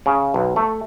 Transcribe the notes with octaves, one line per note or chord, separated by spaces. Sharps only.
C#3
B1
A3